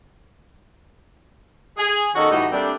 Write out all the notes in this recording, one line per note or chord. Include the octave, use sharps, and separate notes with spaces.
G#4
D#3 A#3 C#4 F#4 A4 D#5
A2 E3 G3 D#4 F#4
G3 A3 A#3 C4 D4